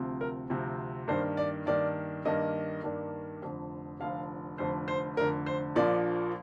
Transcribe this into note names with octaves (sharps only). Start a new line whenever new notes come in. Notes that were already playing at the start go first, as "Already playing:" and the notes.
Already playing: D2 C3 F3 C4
A#4
D2 C3 F3 C4
G2 D#3 A#3 D4 C5
D5
G2 D#3 A#3 D4 D5
G2 D#3 A#3 D4 D#5
G2 D#3 A#3 D4
F1 F2 D3
F1 F2 D3 F5
F1 F2 D3 C5
C5
F1 F2 D3 A#4
C5
A#1 A#2 F3 A#3 D4 D5